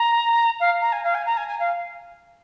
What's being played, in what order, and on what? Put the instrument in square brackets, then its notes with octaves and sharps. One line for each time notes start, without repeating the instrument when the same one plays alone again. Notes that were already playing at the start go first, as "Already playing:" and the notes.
Already playing: [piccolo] A#5
F5
A#5
G#5
F5
G#5
A#5
G#5
G#5
F5